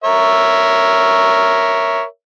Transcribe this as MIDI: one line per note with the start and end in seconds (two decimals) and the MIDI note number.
0.04 2.03 70
0.04 2.03 73
0.04 2.03 76